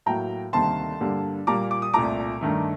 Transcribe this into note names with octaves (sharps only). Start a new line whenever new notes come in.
A2 F#3 A#3 G5 A#5
D2 C3 D#3 G3 A#3 A5 C6
G2 D3 G3 A#3
A#2 G3 A#3 A#5 D6
D6
D#6
C2 A#2 A3 A#5 D6
G2 D#3 A3